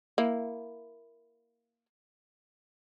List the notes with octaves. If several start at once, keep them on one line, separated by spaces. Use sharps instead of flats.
A#3 E4